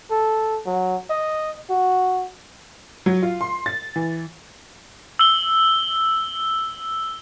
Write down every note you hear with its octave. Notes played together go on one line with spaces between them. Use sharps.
A4
F#3
D#5
F#4
F#3
F4
C6
A6
E3
E6 G7